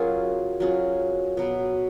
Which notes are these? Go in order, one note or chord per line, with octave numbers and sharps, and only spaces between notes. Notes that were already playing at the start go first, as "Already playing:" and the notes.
Already playing: F#3 C#4 F4 G#4 A#4
F#3 C#4 F4 G#4
B2 F#3 B3